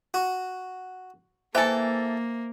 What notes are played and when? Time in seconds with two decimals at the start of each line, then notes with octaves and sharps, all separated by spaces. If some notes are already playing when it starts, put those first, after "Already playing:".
0.14 F#4
1.55 E3 A#3 A4 C5 E5 G5 G#5